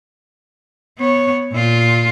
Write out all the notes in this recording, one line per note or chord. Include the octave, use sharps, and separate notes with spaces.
B3 C#5
A#2 F4